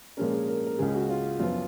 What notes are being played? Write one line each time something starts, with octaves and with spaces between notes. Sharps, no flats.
A#2 F3 G#3 C#4 A#4
G#4
A#4
A#4
C#2 C#3 G#3 G#4
F#4
F4
F#2 F3 B3 F4